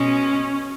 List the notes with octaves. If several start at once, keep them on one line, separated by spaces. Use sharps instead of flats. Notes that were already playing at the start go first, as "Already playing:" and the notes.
Already playing: B2 G#3 C#4